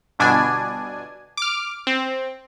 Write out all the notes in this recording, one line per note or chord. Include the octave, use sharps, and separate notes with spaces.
G1 B2 D4 G#5
D6 F6
C4